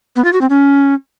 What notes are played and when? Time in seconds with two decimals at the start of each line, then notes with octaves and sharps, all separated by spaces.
0.16 B3
0.24 F4
0.33 F#4
0.41 C4
0.50 C#4